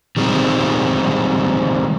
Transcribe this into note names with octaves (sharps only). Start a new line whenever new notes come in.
D#3 G3 G#3 A#3 C4